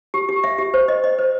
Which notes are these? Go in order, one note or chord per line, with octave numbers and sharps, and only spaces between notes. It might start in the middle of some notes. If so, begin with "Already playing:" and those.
G4
G4
E5
G4
C5
D#5
D#5
C5